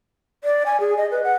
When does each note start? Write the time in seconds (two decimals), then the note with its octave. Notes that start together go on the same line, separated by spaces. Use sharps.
0.44 D5
0.66 G#5
0.80 G#4
0.97 D#5
1.11 B4
1.24 F#5